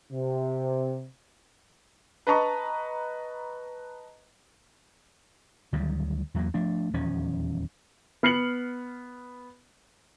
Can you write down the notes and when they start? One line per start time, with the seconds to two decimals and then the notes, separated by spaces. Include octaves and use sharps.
0.12 C3
2.27 B4 D#5 A5 A#5 C#6
5.72 D2 D#3 F#3 G3
6.34 E2 F#3 A#3
6.54 F3 A3 D4
6.93 D#1 E2 F3 C#4
8.23 B3 F6 C7 C#7 F#7